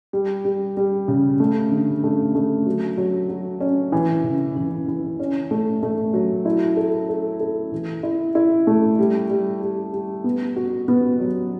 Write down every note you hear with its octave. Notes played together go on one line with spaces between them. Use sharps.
G3
G3
G3
C#3
A3
D3
A3
A3
F#3
F#3
F#3
C#4
E3
C#3
E3
E3
C#4
A3
A3
F#3
E4
A4
A4
A4
E3
E4
E4
A3
G3
G3
G3
G3
B3
F#4
B3
F#3